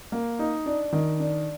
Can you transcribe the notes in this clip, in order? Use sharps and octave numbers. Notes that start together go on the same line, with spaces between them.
A#3
D#4
D4
D#3
D4